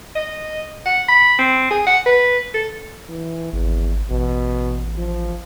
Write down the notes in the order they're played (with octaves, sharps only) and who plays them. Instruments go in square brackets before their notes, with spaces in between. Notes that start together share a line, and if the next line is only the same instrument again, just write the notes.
[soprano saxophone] D#5
F#5
B5
C4
G#4
F#5
B4
A4
[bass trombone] E3
[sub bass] G#1 [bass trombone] E2
[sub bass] A1 [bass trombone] B2
[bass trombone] F3